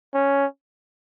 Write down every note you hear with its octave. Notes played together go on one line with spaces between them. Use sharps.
C#4